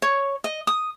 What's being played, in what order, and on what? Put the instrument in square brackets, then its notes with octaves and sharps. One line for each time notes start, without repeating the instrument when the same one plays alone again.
[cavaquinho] C#5
D#5
D#6